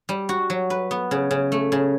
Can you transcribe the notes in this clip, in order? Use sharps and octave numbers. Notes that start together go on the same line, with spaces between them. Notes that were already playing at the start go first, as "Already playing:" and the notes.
G3
F#4
F#3
B4
B3
C#3
C#3
A3
C#3